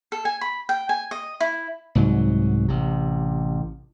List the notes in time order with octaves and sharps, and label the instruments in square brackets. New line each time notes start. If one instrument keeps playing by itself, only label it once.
[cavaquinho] A4
G#5
B5
G5
G#5
D#5
E4
[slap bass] C2 G#2 F#3
A1 C3